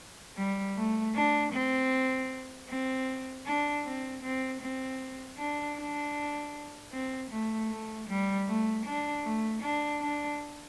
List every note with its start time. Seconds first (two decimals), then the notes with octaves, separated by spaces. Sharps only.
0.37 G3
0.76 A3
1.15 D4
1.53 C4
2.69 C4
3.46 D4
3.85 C4
4.23 C4
4.61 C4
5.38 D4
5.77 D4
6.92 C4
7.31 A3
7.70 A3
8.08 G3
8.48 A3
8.85 D4
9.24 A3
9.62 D4
10.01 D4